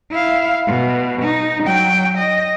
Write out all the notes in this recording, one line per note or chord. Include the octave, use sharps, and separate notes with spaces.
E4 F5
B2
D#4
F#3 G5
D#5